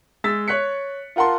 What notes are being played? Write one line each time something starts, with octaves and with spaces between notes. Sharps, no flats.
G#3 E6 A6 B6
C#5 F#6 B6 C#7
F4 A#4 F#5 A5 C6